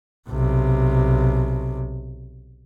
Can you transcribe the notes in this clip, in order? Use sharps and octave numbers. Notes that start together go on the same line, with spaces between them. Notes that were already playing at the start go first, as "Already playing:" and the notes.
B1 C3